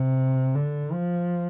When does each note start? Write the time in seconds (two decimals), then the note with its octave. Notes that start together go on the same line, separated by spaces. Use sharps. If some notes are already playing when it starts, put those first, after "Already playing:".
Already playing: C3
0.55 D3
0.92 F3